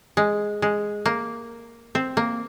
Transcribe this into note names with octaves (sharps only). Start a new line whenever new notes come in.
G#3
G#3
A#3
C4
A#3